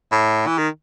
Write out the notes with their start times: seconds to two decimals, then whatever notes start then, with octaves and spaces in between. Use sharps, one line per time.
0.12 A2
0.47 E3
0.58 D#3